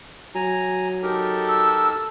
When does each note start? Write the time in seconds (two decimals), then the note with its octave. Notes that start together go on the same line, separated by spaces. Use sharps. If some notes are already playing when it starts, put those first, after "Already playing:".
0.35 F#3 G#5 A#5
1.03 D#4 G4 A4 A#4
1.48 E6